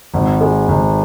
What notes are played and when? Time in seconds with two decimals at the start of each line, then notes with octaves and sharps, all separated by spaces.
0.14 G#1
0.41 G#3
0.68 G#1